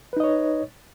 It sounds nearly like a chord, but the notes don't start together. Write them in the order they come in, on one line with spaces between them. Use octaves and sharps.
B4 D#4 D#5 C#5